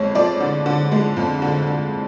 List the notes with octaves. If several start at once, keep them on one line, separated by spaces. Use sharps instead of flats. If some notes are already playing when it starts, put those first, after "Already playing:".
Already playing: F2 G#3 C#5
F3 D5
D3
D3
G#3
F2
D3
D3